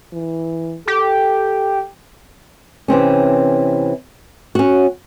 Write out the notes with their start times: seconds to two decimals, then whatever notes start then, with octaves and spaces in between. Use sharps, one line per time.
0.13 E3
0.87 G4 A4
2.88 C3 E3 C4 C#4
4.55 C#4 F#4